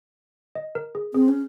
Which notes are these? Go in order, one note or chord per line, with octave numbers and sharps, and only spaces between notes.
D#5
A#4
G#4
C4 G#4
C#4